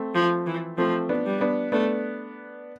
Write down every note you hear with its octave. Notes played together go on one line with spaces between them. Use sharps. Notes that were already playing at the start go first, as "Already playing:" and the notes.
Already playing: A3 C4
F3
E3
F3 A3 C4
B3 D4
G3
B3 D4
A3 B3 D4